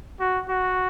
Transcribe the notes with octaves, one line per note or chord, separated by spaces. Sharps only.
F#4
F#4